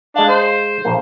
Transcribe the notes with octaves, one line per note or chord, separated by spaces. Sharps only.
G#3 D4 D#5 F5
C5
A#1 A#3